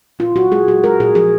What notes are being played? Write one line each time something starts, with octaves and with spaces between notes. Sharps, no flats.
A#2 F4
A#2 F#4
G#3 G#4
A#2 F#4
G#3 A#4
A#2 G#4
F3 G#4